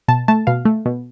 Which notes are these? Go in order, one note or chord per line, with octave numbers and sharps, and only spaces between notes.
B2 A5
A3 A5
B2 F5
A3
B2